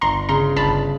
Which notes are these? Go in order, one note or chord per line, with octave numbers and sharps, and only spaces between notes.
G1 A#5 C6
C#3 A#5 C6
G1 A5 B5